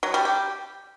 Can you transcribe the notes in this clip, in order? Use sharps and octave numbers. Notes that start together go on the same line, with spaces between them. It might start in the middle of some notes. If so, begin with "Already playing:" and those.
F#3
G3
G4